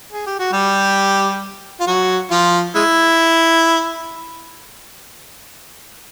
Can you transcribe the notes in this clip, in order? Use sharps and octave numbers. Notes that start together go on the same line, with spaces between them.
G#4
G4
F#4
G3 G4
F4
F#3 F#4
F3 F4
G#3 E4